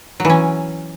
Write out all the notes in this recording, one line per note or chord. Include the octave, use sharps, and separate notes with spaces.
E3 F#3 C#4